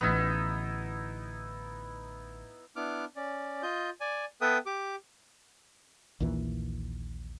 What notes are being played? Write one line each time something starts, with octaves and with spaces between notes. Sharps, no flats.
A1 D3 B3 D#4 E4
B3 D4 E4 D6 F6
C#4 D5
F4 D#5 G6
D5 G#5
B3 A4 B4 E5 G5 D#6
G4 D6
A#1 D#2 A#2 E3